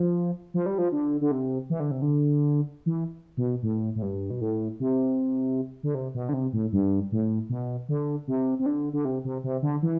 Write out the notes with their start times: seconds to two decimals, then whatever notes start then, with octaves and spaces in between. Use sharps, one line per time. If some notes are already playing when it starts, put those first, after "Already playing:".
Already playing: F3
0.54 F3
0.66 G3
0.78 F3
0.92 D3
1.21 D3
1.31 C3
1.70 E3
1.80 D3
1.91 C3
2.02 D3
2.86 E3
3.37 B2
3.63 A2
3.95 A2
4.02 G2
4.30 B2
4.41 A2
4.80 C3
5.83 D3
5.95 C3
6.14 B2
6.29 D3
6.33 C3
6.53 A2
6.72 G2
7.12 A2
7.49 B2
7.89 D3
8.27 C3
8.59 C3
8.66 D3
8.93 D3
9.05 C3
9.25 C3
9.44 C3
9.62 D3
9.82 E3